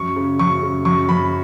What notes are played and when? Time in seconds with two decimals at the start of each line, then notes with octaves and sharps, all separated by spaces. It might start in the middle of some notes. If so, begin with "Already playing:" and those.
Already playing: F#2 C#6
0.16 C#3
0.39 F#2 C#6
0.62 C#3
0.85 F#2 C#6
1.09 F#2 B5